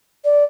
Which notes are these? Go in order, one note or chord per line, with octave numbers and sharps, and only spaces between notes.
D5